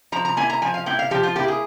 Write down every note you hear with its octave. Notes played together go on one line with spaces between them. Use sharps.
F3 A#5
A#5
A#3 E4 G#5
A#5
F3 G#5
F5
A#3 E4 G5
F5
F3 G4
F4
A#3 E4 G4
G#4